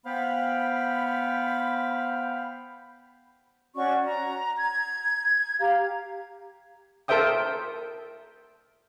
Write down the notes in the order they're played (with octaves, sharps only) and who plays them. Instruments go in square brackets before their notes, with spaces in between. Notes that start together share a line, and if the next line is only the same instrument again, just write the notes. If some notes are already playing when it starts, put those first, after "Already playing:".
[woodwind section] B3 C5 F5 G5 B5
[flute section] C#4 F#4 D5 C#6
A#5
G#6
G4 F5 A#5
[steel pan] A4 A#4 C5 E5 G5 D#6